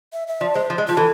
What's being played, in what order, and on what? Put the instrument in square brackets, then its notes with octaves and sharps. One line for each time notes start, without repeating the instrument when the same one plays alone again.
[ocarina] E5
E5
[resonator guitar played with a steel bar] F3 [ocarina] D5
[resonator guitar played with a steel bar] G#3 [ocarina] C5
[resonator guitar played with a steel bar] F3
G#3
[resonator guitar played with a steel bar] F3 [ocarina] F4
[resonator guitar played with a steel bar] E3 [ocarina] A4